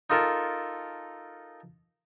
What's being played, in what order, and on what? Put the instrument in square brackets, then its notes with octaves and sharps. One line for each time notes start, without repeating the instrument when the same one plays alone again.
[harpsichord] D#4 F4 A4 A#4